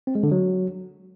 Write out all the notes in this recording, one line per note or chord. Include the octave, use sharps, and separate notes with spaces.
C4
G#3
D3
F#3